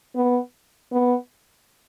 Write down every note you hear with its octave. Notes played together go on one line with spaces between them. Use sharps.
B3
B3